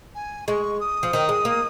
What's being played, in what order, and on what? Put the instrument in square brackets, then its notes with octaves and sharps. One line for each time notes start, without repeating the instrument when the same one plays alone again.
[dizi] G#5
[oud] G#3 [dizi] C#6
[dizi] D#6
[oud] F3
D#3
G#3
A#3